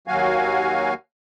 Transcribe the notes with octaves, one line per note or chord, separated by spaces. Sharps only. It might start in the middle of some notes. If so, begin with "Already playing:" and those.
D#2 F#3 F#4 F5 G#5